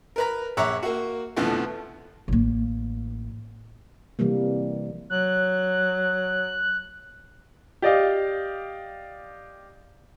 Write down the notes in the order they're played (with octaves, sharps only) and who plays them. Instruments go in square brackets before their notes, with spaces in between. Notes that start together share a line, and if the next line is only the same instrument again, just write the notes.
[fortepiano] A#4 B4 A#5
A#1 C#5 E5 F#5 A#5 D6
A#3 F#4
F2 B2 D3 E3 F3 A3
[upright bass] A1 A#3
[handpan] C3 E3 G3 A#3
[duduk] F#3 [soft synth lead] F#6
[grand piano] G4 D5 D#5 F5